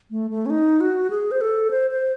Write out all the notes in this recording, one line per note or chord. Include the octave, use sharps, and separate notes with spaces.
A3
A3
C#4
D#4
F#4
G#4
C5
A4
C5
C5